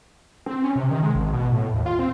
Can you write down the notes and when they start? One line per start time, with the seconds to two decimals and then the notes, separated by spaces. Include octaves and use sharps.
0.46 C4
0.64 C#4
0.76 C3
0.91 D#3
1.03 G#3
1.15 G#1
1.33 B2
1.52 A2
1.73 D#2
1.86 F4
1.99 C4